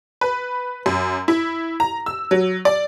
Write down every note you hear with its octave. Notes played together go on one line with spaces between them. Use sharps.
B4
F#2
E4
A#5
E6
F#3
D5